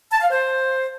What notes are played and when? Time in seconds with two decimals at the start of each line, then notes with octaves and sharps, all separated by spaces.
0.11 A5
0.21 F5
0.30 C5